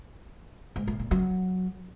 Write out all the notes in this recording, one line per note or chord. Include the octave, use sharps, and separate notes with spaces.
G#2
A2
A#2
F#3